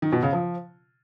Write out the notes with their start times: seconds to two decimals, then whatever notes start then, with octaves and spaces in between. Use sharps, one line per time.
0.02 D#3
0.12 B2
0.23 C#3
0.33 F3